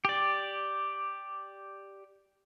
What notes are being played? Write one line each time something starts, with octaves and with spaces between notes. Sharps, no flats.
G4 D5